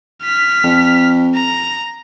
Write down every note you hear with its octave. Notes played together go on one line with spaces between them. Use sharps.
F6 B6
F2
A#5